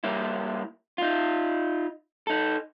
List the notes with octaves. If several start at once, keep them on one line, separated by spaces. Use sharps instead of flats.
G3 A#3 E4
D#4 F4
D#4 A4